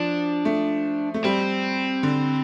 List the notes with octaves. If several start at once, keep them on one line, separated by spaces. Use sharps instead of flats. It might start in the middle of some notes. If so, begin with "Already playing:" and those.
Already playing: F3 D4
A3
A3
G3 C4
D3